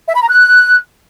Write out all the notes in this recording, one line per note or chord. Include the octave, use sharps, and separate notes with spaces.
E5
B5
A#5
F#6